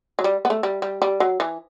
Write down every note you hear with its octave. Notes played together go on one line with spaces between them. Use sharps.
F#3
G3
B3
A3
G3
G3
G3
F#3
E3